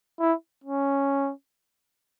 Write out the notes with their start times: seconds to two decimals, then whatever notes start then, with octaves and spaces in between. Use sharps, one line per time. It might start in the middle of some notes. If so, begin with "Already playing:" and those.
0.20 E4
0.64 C#4